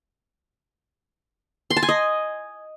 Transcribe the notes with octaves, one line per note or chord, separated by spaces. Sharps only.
C6
A5
G#5
D#5